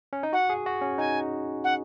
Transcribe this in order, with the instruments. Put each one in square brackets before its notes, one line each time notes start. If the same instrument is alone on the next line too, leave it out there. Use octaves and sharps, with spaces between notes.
[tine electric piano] C#4
D#4
[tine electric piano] F#4 [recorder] F#5
[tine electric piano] G#4
F#4
C#4
[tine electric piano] D#4 [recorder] G#5
[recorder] F#5